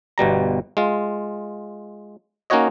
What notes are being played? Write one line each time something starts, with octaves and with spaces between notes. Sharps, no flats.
G1 B2 G3 A#5
G#3 F4
A#3 C#4 D#4 F#4 C#5 D#5